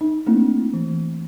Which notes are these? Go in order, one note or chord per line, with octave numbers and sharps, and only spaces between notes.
D#4
A3 A#3 C4 D4 E4
E3